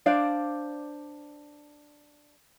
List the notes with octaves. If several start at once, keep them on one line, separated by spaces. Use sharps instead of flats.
D4 C5 D5 F5